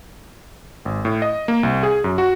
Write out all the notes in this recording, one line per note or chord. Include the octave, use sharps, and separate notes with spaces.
G#1
A2
D#5
A#3
C2
G#4
F#2
F#4